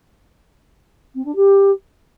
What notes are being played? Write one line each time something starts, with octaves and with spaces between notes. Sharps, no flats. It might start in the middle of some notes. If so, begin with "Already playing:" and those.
C4
D4
G4